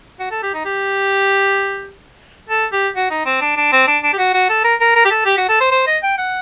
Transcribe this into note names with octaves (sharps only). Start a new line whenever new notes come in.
F#4
A4
G4
D#4
G4
A4
G4
F#4
D#4
C4
D4
D4
C4
D4
D4
G4
F#4
F#4
A4
A#4
A#4
A#4
G4
A4
G4
F#4
A4
C5
C5
D#5
G5
F#5